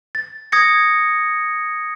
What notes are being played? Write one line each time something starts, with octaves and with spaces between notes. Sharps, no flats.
A6
D#6 G#6 A#6 C#7